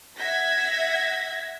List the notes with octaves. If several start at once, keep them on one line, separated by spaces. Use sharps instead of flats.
E5 F#5 G#6 A#6 B6